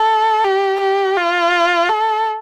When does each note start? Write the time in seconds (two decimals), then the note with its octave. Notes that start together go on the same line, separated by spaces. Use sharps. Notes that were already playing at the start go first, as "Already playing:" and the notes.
Already playing: A4
0.45 G4
0.81 G4
1.17 F4
1.89 A4